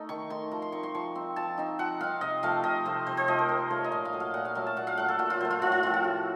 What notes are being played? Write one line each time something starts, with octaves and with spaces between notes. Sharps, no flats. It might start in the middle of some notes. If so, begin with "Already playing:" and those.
Already playing: A3 D#4
D#3 C#6
A3 D#4 C6
F3 A#5
C6
C4 D#4 C#6
C6
F3 C#6
C4 D#4
F3 A5
C4 D#4
F3 F#5
C4 D#4 F5
C3 D#5
F3 A3 F5
C3 D#5
F3 A3 C5
C3 C5
C5
F3 A3 D#5
A#4
C3 A#4
F3 A3 C#5
D#5
A#2 F5
F5
F#3 A3
F5
A#2 F#5
F5
F#3 A3 F5
A5
A#2 F#5
F5
F#3 A3 F#5
A4
A#2 F#4
F4
F#3 A3 C5
F4
A2 F4
F4
F3 C4 F4
F#4
A2